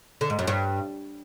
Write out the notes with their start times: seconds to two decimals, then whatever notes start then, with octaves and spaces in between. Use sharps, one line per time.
0.21 D3
0.30 G#2
0.39 F#2
0.47 G2